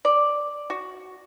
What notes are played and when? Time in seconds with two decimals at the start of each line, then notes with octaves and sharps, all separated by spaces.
0.05 D5
0.70 F#4